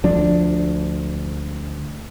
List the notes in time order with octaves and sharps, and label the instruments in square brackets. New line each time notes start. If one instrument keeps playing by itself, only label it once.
[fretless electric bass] D2 F3 D4